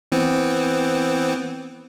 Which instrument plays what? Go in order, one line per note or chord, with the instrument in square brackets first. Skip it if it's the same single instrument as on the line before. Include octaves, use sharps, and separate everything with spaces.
[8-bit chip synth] E3 B3 C4